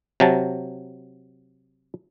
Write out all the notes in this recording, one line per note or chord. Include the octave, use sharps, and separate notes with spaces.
C3 F#3 A5